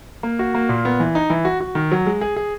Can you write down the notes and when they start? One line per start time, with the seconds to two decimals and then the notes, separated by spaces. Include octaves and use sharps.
0.23 A#3
0.39 F#4
0.55 A#3
0.69 A#2
0.85 B3
1.00 E3
1.15 D#4
1.30 E3
1.45 F#4
1.60 F#4
1.75 D#3
1.92 F#3
2.06 G#3
2.21 G#4
2.36 G#4